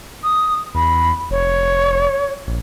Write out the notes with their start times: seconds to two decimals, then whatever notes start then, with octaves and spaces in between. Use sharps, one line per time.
0.23 D#6
0.75 E2 B5
1.30 F1 C#5
2.47 A#1